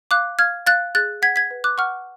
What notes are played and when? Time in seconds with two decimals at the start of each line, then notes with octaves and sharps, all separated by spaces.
0.11 F5 D6 F#6
0.39 F5 F6 G#6
0.66 F5 F#6 A6
0.95 G#4 F#6 A6
1.22 F#5 G#6 B6
1.36 G#6 B6
1.51 B4
1.64 D6 F#6
1.78 F#5 C#6 F6